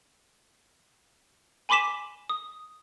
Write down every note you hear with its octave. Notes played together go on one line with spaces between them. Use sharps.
G#5 B5 C6 D6 B6 E7
D#6